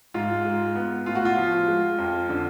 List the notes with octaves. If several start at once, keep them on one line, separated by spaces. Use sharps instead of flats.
G#2 F4
G#3
B3
A2 F4
F#4
F4
F3
G#3
F2
D3